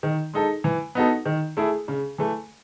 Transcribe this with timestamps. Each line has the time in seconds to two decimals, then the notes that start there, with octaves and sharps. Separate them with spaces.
0.03 D#3
0.33 G#3 D#4 A4
0.64 E3
0.95 B3 D#4 F#4 A4
1.26 D#3
1.57 A3 E4 G#4
1.88 C#3
2.18 E3 A3